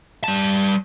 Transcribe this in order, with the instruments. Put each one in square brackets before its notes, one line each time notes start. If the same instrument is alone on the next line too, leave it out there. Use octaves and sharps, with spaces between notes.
[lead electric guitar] G3 A5